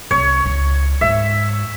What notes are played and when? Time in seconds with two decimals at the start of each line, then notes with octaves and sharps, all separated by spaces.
0.11 C2 C#5
0.46 C#2
1.01 G#2 E5